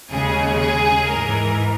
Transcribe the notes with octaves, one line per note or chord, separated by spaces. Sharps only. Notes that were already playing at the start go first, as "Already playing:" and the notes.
D#2 C#3 G#3 G#4
G#4
G#2 E3 G#3 A#4